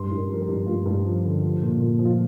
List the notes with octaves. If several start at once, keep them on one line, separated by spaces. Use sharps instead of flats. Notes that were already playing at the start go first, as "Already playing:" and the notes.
Already playing: G2 C6
G2
A#4
F3 A#4
G4
G2
G2 F4
G2
F3
D3
F3
A#2
A#2
F3
F4